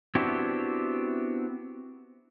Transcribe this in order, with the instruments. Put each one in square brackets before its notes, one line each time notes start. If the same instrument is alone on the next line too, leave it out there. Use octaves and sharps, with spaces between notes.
[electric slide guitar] B3 C4 D4 E4 F#4 G4